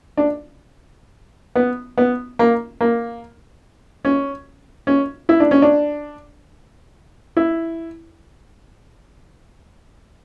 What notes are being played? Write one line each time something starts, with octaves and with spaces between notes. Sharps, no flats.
D4
B3
B3
A#3
A#3
C#4
C#4
E4
D4
C#4
D4
E4